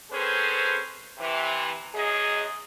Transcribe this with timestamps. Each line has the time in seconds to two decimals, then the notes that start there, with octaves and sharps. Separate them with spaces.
0.11 C4 C#4 G#4 A4 B4 C5
1.18 C3 E3
1.95 F#2 G#4 D#5